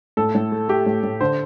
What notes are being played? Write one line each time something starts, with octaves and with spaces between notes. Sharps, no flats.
A2 A4
A2
A3
A3 G4
A2
A2
D3 C5